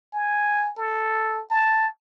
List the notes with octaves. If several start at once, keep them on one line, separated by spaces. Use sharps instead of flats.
G#5
A4
A5